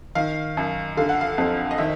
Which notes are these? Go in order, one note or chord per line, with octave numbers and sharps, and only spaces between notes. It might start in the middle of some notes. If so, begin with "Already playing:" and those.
D#3 F5
F#2
D3 F5
F#5
F5
F2
D#5
D#3 E5